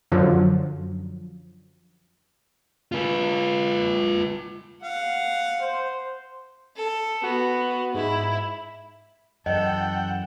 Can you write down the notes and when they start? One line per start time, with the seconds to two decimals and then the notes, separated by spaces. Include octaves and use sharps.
0.12 F#2 D3 F3 F#3
2.92 F4 B4
4.83 F5 F#5
5.61 C5
6.76 A4
7.23 B3 F#4
7.94 G#2 E4
9.46 F#2 E3 A4 D#5 F#5 G5